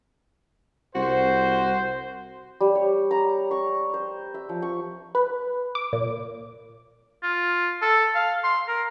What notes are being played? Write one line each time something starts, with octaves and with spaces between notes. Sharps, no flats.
C2 F#4 C5
G3
C#5
A#5
C#6
C5
E5
F3
C#6
B4
D6
A#2
F4
A4
F5
C6
A#4